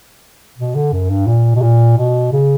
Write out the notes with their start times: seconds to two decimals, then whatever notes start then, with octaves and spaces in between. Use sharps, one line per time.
0.58 B2
0.75 D3
0.93 F#2
1.10 G2
1.27 A#2
1.56 B2
1.62 A#2
1.97 B2
2.32 C#3